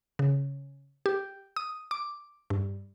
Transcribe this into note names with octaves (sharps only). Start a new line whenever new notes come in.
C#3
G4
D#6
D6
G2